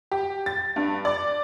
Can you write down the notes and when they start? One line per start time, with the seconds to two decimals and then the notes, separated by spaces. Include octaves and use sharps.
0.11 G4
0.46 A6
0.76 G2
1.05 D5